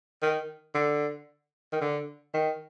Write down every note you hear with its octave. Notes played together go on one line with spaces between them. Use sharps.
D#3
D3
D#3
D3
D#3